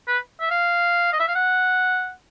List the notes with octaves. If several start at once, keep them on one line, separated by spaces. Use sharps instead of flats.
B4
E5
F5
D#5
E5
F5
F#5